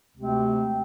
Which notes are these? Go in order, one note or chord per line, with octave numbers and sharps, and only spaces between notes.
D2 C3 G#3 C4